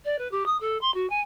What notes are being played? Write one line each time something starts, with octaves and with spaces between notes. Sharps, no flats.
D5
B4
G4
D#6
A4
C6
F#4
G#5